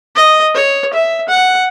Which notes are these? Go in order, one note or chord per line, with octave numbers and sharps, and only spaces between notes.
D#5
C#5
E5
F#5